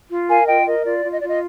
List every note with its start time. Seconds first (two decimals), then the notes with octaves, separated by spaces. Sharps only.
0.10 F4
0.29 A#4 F5 G#5
0.47 F4 D#5 G5
0.66 A#4 D#5
0.84 F4 D5
1.04 F4
1.13 D#5
1.20 F4 D5
1.28 D#5